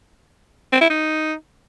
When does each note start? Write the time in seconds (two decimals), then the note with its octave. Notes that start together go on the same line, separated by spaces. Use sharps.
0.73 C4
0.81 E4
0.90 D#4